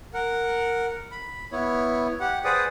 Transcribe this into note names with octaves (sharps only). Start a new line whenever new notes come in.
A#4 F#5
B5
B3 E4 C#5
G4 F#5
G#4 B4 C5 D5 F#5 D#6